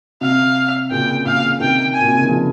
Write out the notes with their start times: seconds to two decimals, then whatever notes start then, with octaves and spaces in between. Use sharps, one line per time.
0.21 C3 F5
0.91 A#2 C#3 G5
1.26 A#2 C#3 F5
1.60 C3 D#3 G5
1.94 G#5
2.01 A#2
2.08 C3
2.15 C#3
2.22 D#3
2.29 C#3 F3